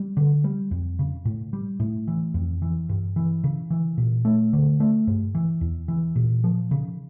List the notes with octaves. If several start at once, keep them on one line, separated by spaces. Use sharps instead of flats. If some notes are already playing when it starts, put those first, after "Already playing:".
Already playing: G3
D3
G3
F2
C#3
A2
G3
A2
E3
F2
E3
G2
E3
C#3
E3
A#2
A3
D3
A3
G2
E3
E2
E3
A#2
F3
C#3